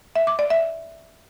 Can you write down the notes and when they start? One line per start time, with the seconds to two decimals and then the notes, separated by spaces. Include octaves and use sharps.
0.16 E5
0.27 D6
0.39 D5
0.50 E5